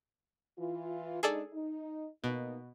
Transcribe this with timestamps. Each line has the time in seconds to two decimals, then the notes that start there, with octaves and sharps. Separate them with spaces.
0.59 E3 F4
1.23 G#3 D4 D#4 G#4 A4 D5
1.53 D#4
2.24 B2 A#3 B3 D#4